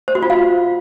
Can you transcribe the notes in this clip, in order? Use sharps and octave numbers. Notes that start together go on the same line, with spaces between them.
C5
F#4
F4
F5